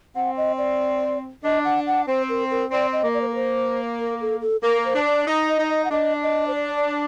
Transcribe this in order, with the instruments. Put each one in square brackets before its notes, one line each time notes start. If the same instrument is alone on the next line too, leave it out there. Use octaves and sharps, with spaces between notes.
[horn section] C4 [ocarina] F#5
[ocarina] D#5
D5
[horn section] D4 [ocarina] D#5
[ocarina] F#5
F#5
[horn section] C4 [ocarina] C5
[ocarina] A#4
A#4
[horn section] C4 [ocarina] D5
[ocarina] D#5
[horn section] A#3
[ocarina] D5
C5
A#4
C5
A#4
A4
A4
[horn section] A#3 [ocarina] A#4
[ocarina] C5
[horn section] D4
[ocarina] D5
[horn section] D#4
[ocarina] D#5
[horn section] D#4
[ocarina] D#5
F#5
[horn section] D4 [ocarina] D#5
[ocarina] D#5
C5
D5
D5